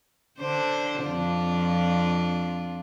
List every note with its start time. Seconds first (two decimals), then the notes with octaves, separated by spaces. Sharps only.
0.39 D3 D4 C5
1.04 F2 D4 F4